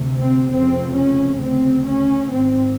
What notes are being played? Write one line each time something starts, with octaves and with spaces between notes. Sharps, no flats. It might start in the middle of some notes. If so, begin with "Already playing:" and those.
Already playing: D2 C3
C4
F1 F2 C#3 C4
C#4
D2 C#3 C4
C#4
G#1 C4
G#2